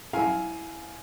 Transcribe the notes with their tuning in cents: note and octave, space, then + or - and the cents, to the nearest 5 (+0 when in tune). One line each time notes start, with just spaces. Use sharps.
E4 +0 F5 +5 G#5 +15